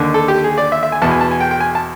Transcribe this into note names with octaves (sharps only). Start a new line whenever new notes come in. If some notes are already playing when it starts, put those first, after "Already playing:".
Already playing: D#2 D3
A4
G4
G#4
D5
E5
E5
G#5
E2 B2 A5
G#5
A5
G#5
G5
G5
G#5
A5